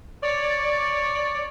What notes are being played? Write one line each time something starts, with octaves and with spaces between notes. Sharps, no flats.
C#5 D5